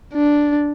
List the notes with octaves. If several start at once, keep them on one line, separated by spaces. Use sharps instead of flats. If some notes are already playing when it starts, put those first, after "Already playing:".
D4